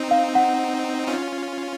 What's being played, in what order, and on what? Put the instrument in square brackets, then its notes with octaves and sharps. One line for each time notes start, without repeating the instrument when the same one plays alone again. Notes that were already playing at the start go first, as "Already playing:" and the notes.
Already playing: [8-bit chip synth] C4 D#4
[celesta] F5
F#5
[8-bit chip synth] C#4 F4